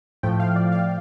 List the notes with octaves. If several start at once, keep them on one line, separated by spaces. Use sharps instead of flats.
A2 F3 A3 G5
F5
D5
F5